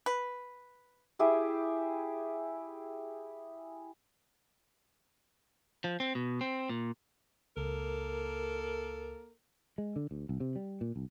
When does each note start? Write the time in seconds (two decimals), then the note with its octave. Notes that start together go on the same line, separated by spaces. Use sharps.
0.06 B4
1.19 E4 G4 G#4 E5
5.84 F3
6.00 C4
6.15 B2
6.41 C4
6.69 A#2
7.57 C#2 A#3 A4 A#4
9.78 G#3
9.96 D3
10.11 D2
10.29 C2
10.40 C3
10.56 G3
10.81 A#2
10.96 C2